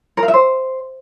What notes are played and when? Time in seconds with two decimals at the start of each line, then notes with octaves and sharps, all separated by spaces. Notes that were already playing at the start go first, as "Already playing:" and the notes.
0.17 A#4
0.23 F5
0.28 E5
0.34 C5